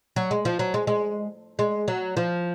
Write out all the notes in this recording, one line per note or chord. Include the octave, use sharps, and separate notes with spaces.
F#3
G#3
F3
F#3
G#3
G#3
G#3
F#3
F3